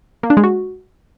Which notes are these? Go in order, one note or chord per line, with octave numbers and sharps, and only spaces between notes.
A#3
D4
G#3
F#4